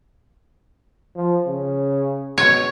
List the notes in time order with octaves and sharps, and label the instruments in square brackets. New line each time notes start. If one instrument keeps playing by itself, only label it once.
[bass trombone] F3
C#3
[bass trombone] B2 [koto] C#5